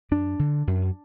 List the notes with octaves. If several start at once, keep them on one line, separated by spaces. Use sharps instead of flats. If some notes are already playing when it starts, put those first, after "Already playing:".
F#2 D4
D3
F#2